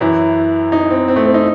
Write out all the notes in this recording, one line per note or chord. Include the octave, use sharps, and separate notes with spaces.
F#2 E3 E4
D#4
C4
C4
A3
C4
D#4